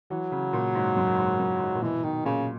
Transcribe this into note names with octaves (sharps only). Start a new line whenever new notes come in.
E3 F#3
C#3
A#2
G#2
F#2
G#2
F#2
G#2
A#2
B2 E3
B2 D#3
A#2 C#3